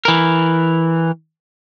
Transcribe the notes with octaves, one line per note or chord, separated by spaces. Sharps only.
E3 A#4